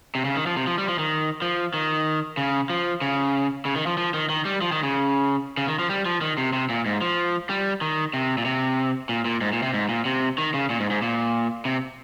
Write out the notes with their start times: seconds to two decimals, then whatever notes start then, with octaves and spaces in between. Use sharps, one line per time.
0.15 C3
0.25 C#3
0.36 D#3
0.46 F3
0.56 C3
0.67 F3
0.78 G3
0.88 F3
0.99 D#3
1.42 F3
1.74 D#3
2.37 C#3
2.70 F3
3.01 C#3
3.65 C#3
3.76 D#3
3.87 F3
3.97 F3
4.14 D#3
4.29 D#3
4.45 G3
4.62 F3
4.72 D#3
4.83 C#3
5.57 C#3
5.68 D#3
5.79 F3
5.90 G3
6.06 F3
6.21 D#3
6.38 C3
6.53 C3
6.69 A#2
6.86 G#2
7.01 F3
7.50 G3
7.81 D#3
8.14 C3
8.38 A#2
8.45 C3
9.09 A#2
9.25 A#2
9.41 G#2
9.53 A#2
9.63 C3
9.74 G#2
9.89 A#2
10.05 C3
10.38 D#3
10.54 C#3
10.70 A#2
10.80 G#2
10.90 G#2
11.02 A#2
11.65 C3